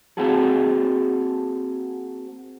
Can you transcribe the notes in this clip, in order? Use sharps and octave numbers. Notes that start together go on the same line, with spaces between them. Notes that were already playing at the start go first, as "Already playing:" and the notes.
A#3 C4 F#4 G#4 A4